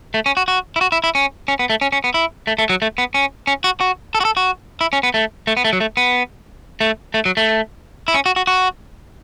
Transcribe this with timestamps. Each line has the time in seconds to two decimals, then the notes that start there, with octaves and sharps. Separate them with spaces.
0.14 A3
0.26 C#4
0.37 F#4
0.48 F#4
0.76 E4
0.81 F#4
0.92 E4
1.04 E4
1.15 C#4
1.48 C#4
1.59 B3
1.70 A3
1.81 C#4
1.92 C#4
2.04 B3
2.14 E4
2.47 A3
2.58 A3
2.69 F#3
2.82 A3
2.98 B3
3.14 C#4
3.47 C#4
3.64 F#4
3.81 F#4
4.15 A4
4.20 F#4
4.25 A4
4.37 F#4
4.81 E4
4.93 C#4
5.03 B3
5.14 A3
5.47 A3
5.57 B3
5.64 A3
5.73 F#3
5.80 A3
5.97 B3
6.81 A3
7.14 A3
7.25 F#3
7.37 A3
8.08 E4
8.14 C#4
8.26 F#4
8.36 F#4
8.47 F#4